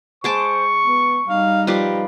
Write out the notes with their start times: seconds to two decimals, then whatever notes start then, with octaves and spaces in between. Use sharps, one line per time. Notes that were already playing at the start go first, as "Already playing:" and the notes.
0.24 G#3 C5 A5 C#6 D6
0.84 B3
1.28 G3 D#4 F5
1.67 F3 G4 B4 D5